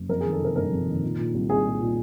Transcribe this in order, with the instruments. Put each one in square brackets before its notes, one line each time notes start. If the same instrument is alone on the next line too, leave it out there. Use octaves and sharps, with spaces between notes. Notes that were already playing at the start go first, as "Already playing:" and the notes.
Already playing: [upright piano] F#1
F2 A#4
D#3 G#4
A4
C3 A#4
G1 A#4
F2
D#3
A#2
A#2
C2
C2 G#4
A#2
A#2